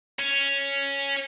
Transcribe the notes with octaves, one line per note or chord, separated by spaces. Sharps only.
C#4